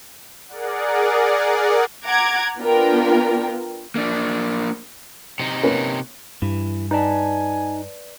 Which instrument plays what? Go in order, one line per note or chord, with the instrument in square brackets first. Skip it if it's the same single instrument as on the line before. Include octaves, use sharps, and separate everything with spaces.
[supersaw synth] G#4 A#4 D5 F#5
[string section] F#5 A#5 D6 G#6
B3 D4 F4 A#4 G5
[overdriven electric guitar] A#3 D4
C3 D#4
[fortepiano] A#3 C#4 B4
[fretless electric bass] G2 [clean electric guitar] E3
[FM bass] D#4 [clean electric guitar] B4 D5 A5 [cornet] G#5